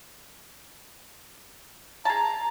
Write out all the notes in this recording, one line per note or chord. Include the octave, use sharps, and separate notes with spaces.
G#4 A5 A#5